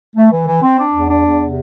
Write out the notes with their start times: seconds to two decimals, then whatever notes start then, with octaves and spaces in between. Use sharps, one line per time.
0.16 A3
0.31 E3
0.47 E3
0.63 C4
0.78 D4
0.94 E2
1.09 D4
1.25 E2
1.40 C3